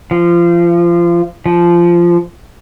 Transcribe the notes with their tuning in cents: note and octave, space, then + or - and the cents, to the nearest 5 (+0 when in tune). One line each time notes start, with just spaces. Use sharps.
F3 -25
F3 -15